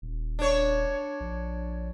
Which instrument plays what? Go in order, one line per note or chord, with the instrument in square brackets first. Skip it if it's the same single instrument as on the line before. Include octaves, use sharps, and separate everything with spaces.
[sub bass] D#1
[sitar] D4 C#5
[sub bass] A#1